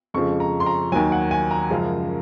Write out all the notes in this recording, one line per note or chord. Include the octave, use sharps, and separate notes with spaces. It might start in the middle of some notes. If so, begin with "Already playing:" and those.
F2 C#3 F3 G#3 C#6
A#5
C6
A#5
D#2 D#3 F#3 G#5
F#5
G#5
A#5
F#2 C#3 F3 G#3